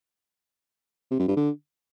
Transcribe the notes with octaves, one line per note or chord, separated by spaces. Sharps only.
C3
F#2
G2
D3